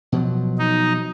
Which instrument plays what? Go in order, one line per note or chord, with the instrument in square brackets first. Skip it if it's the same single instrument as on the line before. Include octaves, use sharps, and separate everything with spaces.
[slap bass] B2 F3 F#3
[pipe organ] D#4